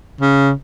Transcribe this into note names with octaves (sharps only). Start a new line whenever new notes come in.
C#3